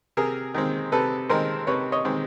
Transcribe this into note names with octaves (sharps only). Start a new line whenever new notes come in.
C3 G#4 A#4
D#3 G#3 C4
C3 A4 B4
D#3 G#3 C4 A#4 C5
C3 B4 C#5
C#5 D#5
D#3 G#3 C4